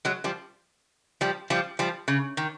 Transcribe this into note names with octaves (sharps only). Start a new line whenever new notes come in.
F#3 G#3
F3 G3
F3 G3
F3 G3
F3 G3
C#3
D#3